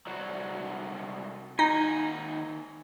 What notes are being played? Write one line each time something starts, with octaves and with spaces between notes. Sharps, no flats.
C2 F#3
D#2 D#4 G#5